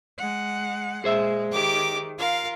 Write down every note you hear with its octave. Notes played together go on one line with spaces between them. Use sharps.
G#3 F#5
A#2 G#3 G#4 C5 E5
D#3 G4 D6
F4 A#4 F5